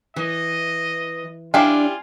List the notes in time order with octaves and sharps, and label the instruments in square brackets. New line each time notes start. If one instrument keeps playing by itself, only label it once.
[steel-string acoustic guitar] E3 [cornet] D#5
[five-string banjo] G3 E4 F5 [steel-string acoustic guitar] D4 D5 [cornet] F4 [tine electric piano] G#5